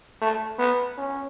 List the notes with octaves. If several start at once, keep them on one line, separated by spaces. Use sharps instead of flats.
A3
B3
C#4